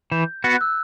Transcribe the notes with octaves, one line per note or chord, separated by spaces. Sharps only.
E3 G6
B3 F#4 F#6
E6